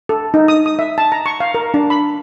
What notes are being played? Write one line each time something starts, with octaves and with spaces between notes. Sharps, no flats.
A4
D#4
D#6
D#6
E5
A5
A#5
C#6
F5
A#4
D4
B5